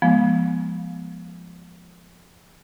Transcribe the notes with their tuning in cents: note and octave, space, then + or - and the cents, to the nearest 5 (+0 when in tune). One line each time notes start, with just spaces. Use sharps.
F3 -5 G#3 +0 B3 -30